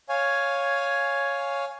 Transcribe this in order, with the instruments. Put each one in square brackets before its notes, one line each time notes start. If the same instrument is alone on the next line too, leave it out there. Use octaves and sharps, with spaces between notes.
[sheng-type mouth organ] C#5 F5 G#5